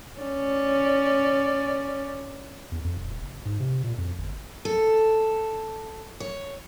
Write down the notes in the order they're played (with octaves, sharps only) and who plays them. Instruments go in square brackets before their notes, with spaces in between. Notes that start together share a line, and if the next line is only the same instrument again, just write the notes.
[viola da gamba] C#4 D5
[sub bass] E2
F2
D#1
F#1
G#2
C3
A#2
F2
G1
[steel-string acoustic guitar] A4
C#5